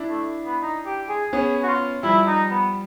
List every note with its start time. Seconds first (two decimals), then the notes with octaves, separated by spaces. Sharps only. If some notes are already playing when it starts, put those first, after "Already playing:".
Already playing: D4 E4
0.09 A3
0.45 B3
0.62 D#4
0.86 G4
1.09 G#4
1.33 B3 C#4 G#4
1.63 F#4
1.68 F4
2.03 F3 G3 E4
2.27 D#4
2.50 B3